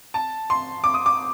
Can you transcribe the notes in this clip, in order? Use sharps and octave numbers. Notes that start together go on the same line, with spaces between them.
A5
C6
D6
D#6
D6